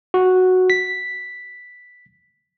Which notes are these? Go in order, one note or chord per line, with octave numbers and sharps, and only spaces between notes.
F#4
B6